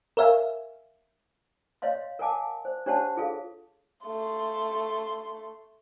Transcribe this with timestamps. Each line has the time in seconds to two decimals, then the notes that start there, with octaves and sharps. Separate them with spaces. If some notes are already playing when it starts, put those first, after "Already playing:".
0.17 A#4 C#5 E5 F5 G#5
1.82 C#5 D#5 F5 C6
2.19 A#4 F5 F#5 G#5 A5 D6
2.65 C5
2.86 D4 G4 C5 C#5 F#5 A5
3.17 F4 G#4 A4 F5
4.03 A3 C6